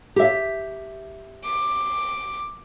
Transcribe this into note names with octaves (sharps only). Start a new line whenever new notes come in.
G4 E5
D6